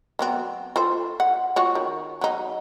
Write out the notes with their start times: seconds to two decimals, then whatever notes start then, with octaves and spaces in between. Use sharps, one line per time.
0.19 F#3 B3 C4
0.76 F4 A4 C5
1.20 F#5
1.56 F4 F#4 C#5
1.75 D#3
2.21 F#3 D#4